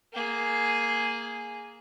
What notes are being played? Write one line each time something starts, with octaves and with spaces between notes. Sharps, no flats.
A#3 G#4